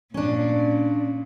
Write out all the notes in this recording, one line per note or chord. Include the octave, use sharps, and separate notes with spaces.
A#2 C#4 D4